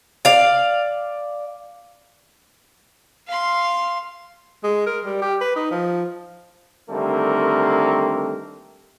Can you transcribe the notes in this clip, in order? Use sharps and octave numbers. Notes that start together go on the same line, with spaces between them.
D5 F5
F5 C6
G#3
A#4
G3
G4
B4
D#4
F3
D3 D#3 G3 A3 A#3 C4